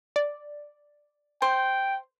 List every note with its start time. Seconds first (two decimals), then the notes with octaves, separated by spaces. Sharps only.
0.16 D5
1.42 C5 G5